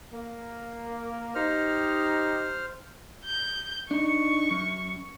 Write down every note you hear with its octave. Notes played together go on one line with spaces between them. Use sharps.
A#3
D#4 G4 C5 F6
G6
D4 D#4 C#6
F#2